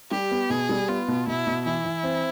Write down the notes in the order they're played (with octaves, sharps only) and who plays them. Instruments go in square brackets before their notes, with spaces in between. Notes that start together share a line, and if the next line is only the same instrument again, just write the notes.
[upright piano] G3 [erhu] G4
[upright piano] B3
[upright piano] B2 [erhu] G#4
[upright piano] G3
[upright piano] B3 [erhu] F4
[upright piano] B2
[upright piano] B2 [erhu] E4
[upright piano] B2
[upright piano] E3 [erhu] E4
[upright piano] E3
C4